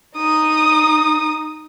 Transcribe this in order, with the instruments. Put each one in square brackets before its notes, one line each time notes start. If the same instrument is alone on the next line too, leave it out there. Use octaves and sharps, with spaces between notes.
[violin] D#4 D#6